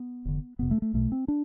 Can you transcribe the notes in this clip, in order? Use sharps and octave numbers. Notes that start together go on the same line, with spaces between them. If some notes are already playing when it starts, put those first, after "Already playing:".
Already playing: B3
F1 F2 D3
F1 F2 C3 B3
A3
A3
B1 B2 A3
C4
D4